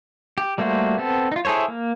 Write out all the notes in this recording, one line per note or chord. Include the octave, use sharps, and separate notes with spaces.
G4
G3 A3 A#3 F#4 C5
B3 C4 A4
D#4 F4
E4 G#4 A4 C5 C#5
A#3